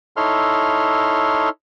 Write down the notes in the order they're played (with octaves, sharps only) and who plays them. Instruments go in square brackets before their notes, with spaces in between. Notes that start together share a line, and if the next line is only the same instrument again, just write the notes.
[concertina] D#4 E4 A4 C#5 C6 F6